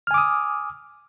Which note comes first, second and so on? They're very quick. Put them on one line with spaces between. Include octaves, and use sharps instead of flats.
F6 G#5 D6 D#6